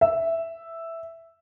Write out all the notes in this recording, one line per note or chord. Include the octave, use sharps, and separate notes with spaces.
E5